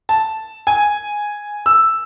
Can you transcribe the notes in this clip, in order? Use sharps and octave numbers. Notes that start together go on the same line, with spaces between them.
A5
G#5
E6